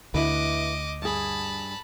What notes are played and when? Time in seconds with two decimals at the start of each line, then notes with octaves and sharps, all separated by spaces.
0.14 D2 D3 E4 B4 D#5 D6
1.02 G2 G#4 A5 B5